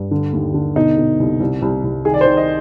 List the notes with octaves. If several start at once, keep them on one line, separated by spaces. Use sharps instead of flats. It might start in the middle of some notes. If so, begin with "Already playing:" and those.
Already playing: G2
D3
D#2
D3
B2 D#4
B2
C2
C2
C2
C2
D#3 G#4
D5
C5
D#3
D#5